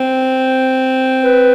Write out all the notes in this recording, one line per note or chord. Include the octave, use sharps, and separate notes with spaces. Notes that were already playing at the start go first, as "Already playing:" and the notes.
Already playing: C4
B4